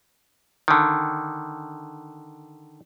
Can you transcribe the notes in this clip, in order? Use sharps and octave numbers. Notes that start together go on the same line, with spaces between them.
D3 D#3